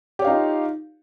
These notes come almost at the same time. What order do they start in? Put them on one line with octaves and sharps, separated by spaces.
G4 C#5 F5 D#4 F4